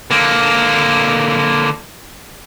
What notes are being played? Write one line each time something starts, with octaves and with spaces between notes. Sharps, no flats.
D3 A#3